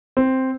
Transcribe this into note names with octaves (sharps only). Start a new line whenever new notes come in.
C4